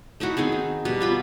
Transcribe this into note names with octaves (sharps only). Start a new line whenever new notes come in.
A3 D#4 E4 F#4
D#3 C4 D#4 G#4
D#4
B2 G3
B3 F4 B5